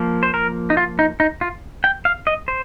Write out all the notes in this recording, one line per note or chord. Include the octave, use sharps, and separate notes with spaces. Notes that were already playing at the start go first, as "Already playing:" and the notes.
Already playing: F3 A#3
C5
A#4
D#4
F4
D#4
D#4
F4
G5
F5
D#5
C5